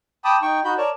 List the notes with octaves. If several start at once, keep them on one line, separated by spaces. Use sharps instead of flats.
G5 A5 B5 D6 D#6
D#4 G5 C#6
D#4 F#4 B5 G6
A#4 C#5 D5 A5